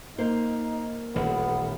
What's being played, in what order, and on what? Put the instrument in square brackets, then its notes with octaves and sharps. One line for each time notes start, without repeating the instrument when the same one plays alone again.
[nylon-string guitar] A#3 C5 [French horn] D#4
[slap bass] D#1 A1 D#2 [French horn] B3